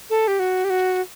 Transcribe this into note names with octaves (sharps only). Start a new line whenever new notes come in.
A4
G4
F#4
G4
F#4